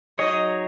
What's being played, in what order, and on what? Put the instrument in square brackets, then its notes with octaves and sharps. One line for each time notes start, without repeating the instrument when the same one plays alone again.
[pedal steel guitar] F#3 D#4 G#4 C#5 [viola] D#5